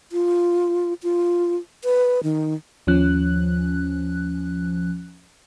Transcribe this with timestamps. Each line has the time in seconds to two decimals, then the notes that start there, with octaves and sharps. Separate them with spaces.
0.12 F4
1.03 F4
1.84 B4
2.24 D#3
2.87 D#2 F3 C#4 F#6